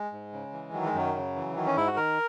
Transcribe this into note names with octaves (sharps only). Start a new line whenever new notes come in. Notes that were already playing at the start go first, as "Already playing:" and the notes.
Already playing: G#3
G#2
C#3
E3
D#3 F#3
G#3
F#2 F#3
C#3
E3
D#3 F#3
C#4
G#2 E4
F#4
D#3 A#4